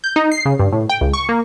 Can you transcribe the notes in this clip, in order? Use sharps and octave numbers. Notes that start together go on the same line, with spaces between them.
G6
D#4
C7
C#3
G2
A2
G5
C#2
C#6
A#3